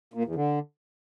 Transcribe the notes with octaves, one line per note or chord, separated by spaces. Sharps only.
A#2
E2
D3